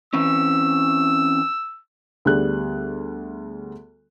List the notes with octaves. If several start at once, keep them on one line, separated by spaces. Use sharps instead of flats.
E3 C4 C#4 E6
D2 G3 B3 G#4 D5 F#6